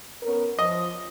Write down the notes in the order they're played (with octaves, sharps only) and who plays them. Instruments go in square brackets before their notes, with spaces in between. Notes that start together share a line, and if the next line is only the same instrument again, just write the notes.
[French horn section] B3 C#4 A#4
[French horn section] F3 [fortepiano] D#5